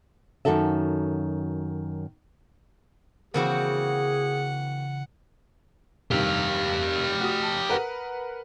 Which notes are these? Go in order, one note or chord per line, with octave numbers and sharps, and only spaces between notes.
F#2 C3 D#3 F#4 A4 E5
C#3 E3 A#3 C4 F#4 G#4 F#5
G2 C3 D#3 G4 F5
F#4 D#6
A5
A#4 B4 F#5